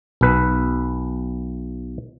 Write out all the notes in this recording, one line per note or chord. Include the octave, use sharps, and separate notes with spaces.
B1 B4